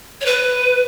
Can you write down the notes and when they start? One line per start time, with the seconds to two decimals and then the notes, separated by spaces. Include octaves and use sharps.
0.21 C#5
0.26 B4